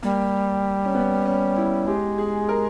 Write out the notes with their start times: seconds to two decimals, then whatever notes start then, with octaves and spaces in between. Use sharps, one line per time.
0.03 G3 A#3
0.85 C#4
0.95 B3
1.26 C#4
1.56 E4
1.87 G#3 G4
2.18 G#4
2.49 A#4